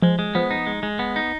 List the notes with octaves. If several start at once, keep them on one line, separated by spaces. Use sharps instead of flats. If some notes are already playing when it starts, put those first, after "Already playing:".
F3 G#3
G#3
F3 B3
D#4
G#3
G#3
B3
D#4